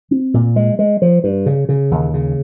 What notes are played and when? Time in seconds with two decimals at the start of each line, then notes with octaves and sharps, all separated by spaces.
0.11 C4
0.34 A#2
0.56 G#3
0.79 G#3
1.02 F3
1.24 G2
1.46 C#3
1.69 C#3
1.91 D#2
2.14 C#3